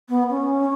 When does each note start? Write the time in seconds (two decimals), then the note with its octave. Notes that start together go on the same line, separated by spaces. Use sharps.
0.08 B3
0.29 C#4